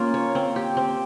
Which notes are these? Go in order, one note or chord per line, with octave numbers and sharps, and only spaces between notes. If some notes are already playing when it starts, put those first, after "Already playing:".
Already playing: A#3 C#4 F4
C#5
C4
G4
C4